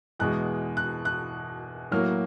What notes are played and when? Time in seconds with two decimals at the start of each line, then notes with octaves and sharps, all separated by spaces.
0.20 E2 B2 G#3 F#6
0.77 F#6
1.05 F#6
1.91 A2 F#3 A#3 F6